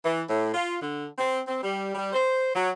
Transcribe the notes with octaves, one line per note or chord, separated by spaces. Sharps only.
E3
A2
F4
D3
C4
C4
G3
G3
C5
F#3